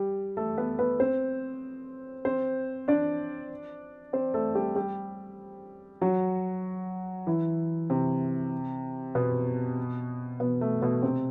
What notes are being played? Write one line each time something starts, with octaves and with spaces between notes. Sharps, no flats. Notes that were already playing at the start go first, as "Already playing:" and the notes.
Already playing: G3 G4
A3 A4
B3 B4
B3 B4
C4 C5
C4 C5
D4 D5
C4 C5
A3 A4
G3 G4
G3 G4
F#3 F#4
E3 E4
C3 C4
B2 B3
B2 B3
A3
B2 B3
C3 C4